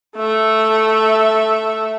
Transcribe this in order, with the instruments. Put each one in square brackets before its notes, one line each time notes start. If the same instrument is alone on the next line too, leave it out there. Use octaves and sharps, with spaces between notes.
[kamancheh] A3 E5